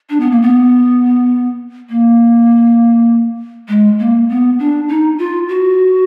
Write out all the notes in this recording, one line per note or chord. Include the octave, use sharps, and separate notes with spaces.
D4
B3
A#3
B3
A#3
G#3
A#3
B3
D4
D#4
F4
F#4